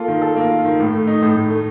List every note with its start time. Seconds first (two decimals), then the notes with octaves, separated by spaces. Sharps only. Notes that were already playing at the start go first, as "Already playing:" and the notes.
Already playing: A#3 F4 A4
0.08 D#3
0.22 A4
0.36 A#3
0.50 F4
0.64 D#3
0.80 A2
0.93 A3
1.07 D#4
1.22 A2
1.36 A2
1.50 A3